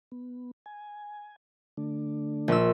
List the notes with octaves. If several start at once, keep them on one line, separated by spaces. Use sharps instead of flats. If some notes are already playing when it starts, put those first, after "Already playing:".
B3
G#5
D3 A3 D4
A#1 E6